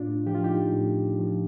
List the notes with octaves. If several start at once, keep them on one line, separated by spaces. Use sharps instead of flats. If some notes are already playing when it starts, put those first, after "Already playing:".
Already playing: A2 D4 F4
F3 G4
F4
D#4 G4
A2
F3